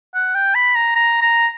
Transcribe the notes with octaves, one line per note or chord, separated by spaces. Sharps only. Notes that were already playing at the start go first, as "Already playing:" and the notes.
F#5
G5
B5
A#5
A#5
A#5